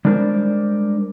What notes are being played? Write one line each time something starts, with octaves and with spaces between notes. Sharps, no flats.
G3 G#3 D4 A#4 C5 D5